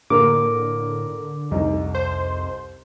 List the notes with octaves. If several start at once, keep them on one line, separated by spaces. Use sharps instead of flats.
A2 D3 A#3 A#4 D6
C2 F2 D#4
C5